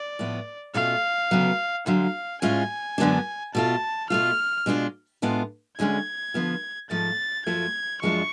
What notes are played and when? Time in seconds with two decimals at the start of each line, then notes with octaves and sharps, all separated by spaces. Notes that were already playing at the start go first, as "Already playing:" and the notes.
Already playing: D5
0.19 A2 F3 B3
0.74 B2 A3 C#4 F4 F5
1.31 D2 C#3 F#3 B3
1.86 D2 D3 F#3 F5
2.42 A2 G#3 C#4 F4 G#5
2.98 F#2 D3 G#3 B3 D4
3.54 B2 A3 F4 A5
4.10 B2 A3 F4 F6
4.66 B2 G#3 D4 F4
5.22 A2 G#3 B3 D4 F4
5.78 D2 D3 G#3 C#4 G#6
6.34 D3 F3 B3 F4
6.90 G#2 F3 A3 A6
7.46 F#2 F3 A3 F4 G#6
8.02 F#2 F3 G#3 D4 F4 C#6